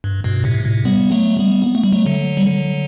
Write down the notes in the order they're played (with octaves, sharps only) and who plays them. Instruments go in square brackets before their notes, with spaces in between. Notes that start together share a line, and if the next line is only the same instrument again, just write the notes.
[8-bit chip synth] G2
G2 B2
A2 C3
A2 C3
G3 B3
F#3 A3
G3 B3
B3
A3
G3
F#3 A3
D3 F#3
G3
D3 F#3